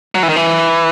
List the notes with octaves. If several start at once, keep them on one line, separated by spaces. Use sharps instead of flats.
F#3
E3
D#3
E3